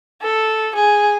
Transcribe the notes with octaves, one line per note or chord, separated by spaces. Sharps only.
A4
G#4